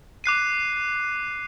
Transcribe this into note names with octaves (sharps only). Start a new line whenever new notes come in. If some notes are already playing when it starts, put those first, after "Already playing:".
D6 F#6 C7 D#7